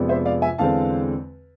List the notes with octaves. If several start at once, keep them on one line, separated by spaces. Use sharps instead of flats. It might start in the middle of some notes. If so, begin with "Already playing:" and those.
Already playing: F2 C3 G#3 B3 D4
C5 E5
D5 F5
E5 G#5
E2 D3 G#3 C4 F5 A5